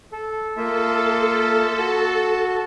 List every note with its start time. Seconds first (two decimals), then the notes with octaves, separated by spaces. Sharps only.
0.12 A4
0.57 A#3 F4 A4 E5
1.78 F#4 A5